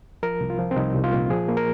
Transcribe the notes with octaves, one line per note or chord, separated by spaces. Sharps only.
F3 A#4
C2
F4
F3
C4
C2 D#4
C2
F4
A#2
F3 G#4
A#3
A#4